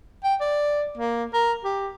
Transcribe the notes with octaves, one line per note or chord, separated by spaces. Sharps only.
G5
D5
A#3
A#4
G4